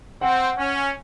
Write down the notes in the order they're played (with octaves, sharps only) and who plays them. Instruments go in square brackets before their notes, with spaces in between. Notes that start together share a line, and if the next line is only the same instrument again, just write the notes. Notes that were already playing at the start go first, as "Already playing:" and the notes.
[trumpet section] C4 [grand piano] F#5
[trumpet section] C#4